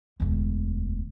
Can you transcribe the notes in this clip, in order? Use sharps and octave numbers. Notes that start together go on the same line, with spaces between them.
E1 D2